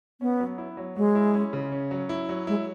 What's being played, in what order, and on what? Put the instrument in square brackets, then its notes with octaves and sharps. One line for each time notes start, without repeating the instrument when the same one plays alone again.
[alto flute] B3 [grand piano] C#4
[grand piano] F#3
E4
F#3
[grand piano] F#3 [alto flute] G#3
[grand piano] E4
C#4
C#3
C#4
F#3
E4
F#3
[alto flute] G#3 [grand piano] E4